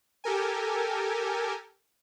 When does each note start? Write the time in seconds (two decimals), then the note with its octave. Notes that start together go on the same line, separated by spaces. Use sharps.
0.24 G4 A4 A#4 G#5